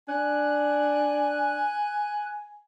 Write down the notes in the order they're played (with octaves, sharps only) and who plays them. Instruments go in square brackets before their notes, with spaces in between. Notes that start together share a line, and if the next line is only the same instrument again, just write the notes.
[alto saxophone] D4 [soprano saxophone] G#5 [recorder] F#6